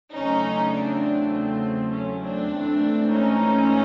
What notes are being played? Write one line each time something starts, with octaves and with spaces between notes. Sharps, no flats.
E2 C#3 F#3 A3 C4 C#4 D#4
C4 D4
C4
C#4
C4 D4
G#2 E3 A3 C4
C#4 D#4